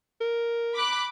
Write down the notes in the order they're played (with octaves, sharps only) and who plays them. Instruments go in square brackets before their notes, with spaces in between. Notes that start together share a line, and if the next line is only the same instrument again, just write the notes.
[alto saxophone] A#4
[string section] B5 D6 F#6